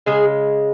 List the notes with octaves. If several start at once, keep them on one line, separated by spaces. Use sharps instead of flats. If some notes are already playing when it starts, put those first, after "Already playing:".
C#3 G#3 G#4